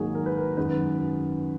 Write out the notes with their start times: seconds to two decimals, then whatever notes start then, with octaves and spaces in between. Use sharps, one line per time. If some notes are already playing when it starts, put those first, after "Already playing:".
Already playing: G#2 D#3 F#3 A#3 F#4 G#4
0.15 A#4
0.26 B4
0.37 A#4
0.57 F#2 D#3 G#3 B4